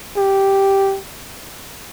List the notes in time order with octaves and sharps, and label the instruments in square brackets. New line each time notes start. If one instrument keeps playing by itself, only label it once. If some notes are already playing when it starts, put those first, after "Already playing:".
[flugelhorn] G4